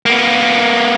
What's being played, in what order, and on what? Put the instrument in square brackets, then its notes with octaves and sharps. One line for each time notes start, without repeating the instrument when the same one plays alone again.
[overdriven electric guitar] A#3 B3